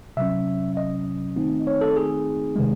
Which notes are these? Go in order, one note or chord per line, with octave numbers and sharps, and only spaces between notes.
C3 F#3 C#4 E5
D#5
D#3 A3 C4 D#4
C#5
A4
G#4
C3 D#3 G#3